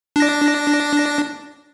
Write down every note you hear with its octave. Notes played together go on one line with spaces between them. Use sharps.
D4 A#6